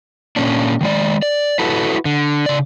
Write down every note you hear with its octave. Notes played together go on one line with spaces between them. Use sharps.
A#2 A#3 C#4 D4
D#3 G#3 D5
D5
E4 F#4 A4 B4
D3
C#3 D5